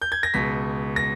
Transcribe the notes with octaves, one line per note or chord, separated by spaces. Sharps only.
G6
G#6
A#6
C#2 B2 B6
A#6